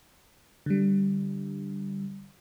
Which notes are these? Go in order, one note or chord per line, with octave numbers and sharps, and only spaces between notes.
D3 G3